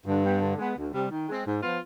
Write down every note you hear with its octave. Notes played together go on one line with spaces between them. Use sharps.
G2 D3
G3 B3
D3
G#3 B3
D2
C3 G3
D#3
G#3 C4
G#2
F3 B3 F4